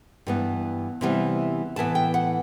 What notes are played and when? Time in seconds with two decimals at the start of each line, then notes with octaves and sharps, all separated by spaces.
0.27 G2 E3 B3
1.01 C3 E3 G3 B3
1.76 A2 E3 B3 A5
1.95 G5
2.14 F#5